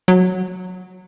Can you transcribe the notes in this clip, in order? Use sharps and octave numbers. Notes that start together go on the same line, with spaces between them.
F#3